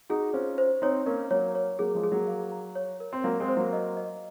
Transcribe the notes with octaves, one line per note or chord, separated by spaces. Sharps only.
D#4 F#4 G#4
C#4 F4 C5
C5
C4 D#4 C#5
A#3 C#4 A#4
F#3 A#3 C#5
C#5
F#3 A#3 G#4
F3 G#3
G#4
F#3 A#3
F5
A#5
C#5
A#4
C4
F#3 A#3 F5
G#3 C4
C5
F#3 A#3
D#5
D#5